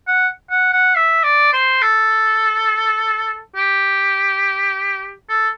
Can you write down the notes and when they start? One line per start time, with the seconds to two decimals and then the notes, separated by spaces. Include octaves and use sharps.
0.08 F#5
0.51 F#5
0.73 F#5
0.95 E5
1.24 D5
1.53 C5
1.82 A4
3.56 G4
5.29 A4